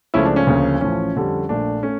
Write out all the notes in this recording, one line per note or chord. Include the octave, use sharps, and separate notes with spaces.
C#2 C#3 F3 A3 C#4 E4
D4
C#4
D2 C#3 F3 A#3
A1 A2 F3 C#4
F2 D3 G3 C#4
A#1 A#2 A3 D4
A3 C#4